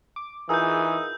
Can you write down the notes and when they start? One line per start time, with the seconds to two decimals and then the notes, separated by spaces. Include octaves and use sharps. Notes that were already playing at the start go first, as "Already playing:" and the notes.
0.16 D6
0.49 E3 D#4 F4 G#4 A#4 E6 G6